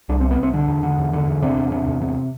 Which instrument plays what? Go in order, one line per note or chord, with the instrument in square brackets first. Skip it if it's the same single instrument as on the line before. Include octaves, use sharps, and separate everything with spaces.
[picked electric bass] C2 D4
C4
C3
B3
C2 C4
D3 D4
E2
D3
E2
D3
E2
C3 D4
E2
C3
E2
C3